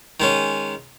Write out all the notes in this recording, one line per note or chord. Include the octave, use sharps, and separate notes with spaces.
D#3 G#3 C#4